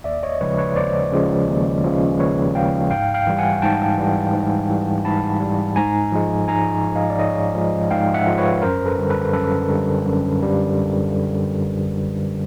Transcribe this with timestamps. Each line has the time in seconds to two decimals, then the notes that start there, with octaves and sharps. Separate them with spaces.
0.04 D#2 D5 E5
0.23 C#5 D#5
0.41 C#3 F3 G#3 B4 C#5
0.58 B4 C#5
0.76 D#2 C5 D5
1.11 C#3 F3 G#3
1.48 D#2
1.84 C#3 F3 G#3
2.19 D#2 B4 C#5
2.55 C#3 F3 G#3 F5 G5
2.90 G#2 F5 G5
3.14 F5 G5
3.27 E3 G3
3.39 F#5 G#5
3.62 G#2 G5 A5
3.98 E3 G3
4.34 G#2
4.70 E3 G3
5.05 G#2 A5 B5
5.40 E3 G3
5.76 G#2 G#5 A#5
6.12 F3 G#3
6.48 G#2 G#5 A#5
6.83 F3 G#3
6.96 D#5 F5
7.10 D5
7.19 G#2 C#5 D#5
7.54 F3 G#3
7.91 G#2 F5 G5
8.14 E5 F#5
8.27 F3 G#3
8.38 B4 C#5
8.62 F#2 A#4 C5
8.86 A4 B4
8.98 D3 G3
9.09 A4 B4
9.33 F#2 A4 B4
9.70 D3 G3
10.05 F#2
10.41 D3 G3